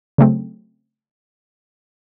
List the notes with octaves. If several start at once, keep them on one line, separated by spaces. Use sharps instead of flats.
C#3 F#3 A3 C4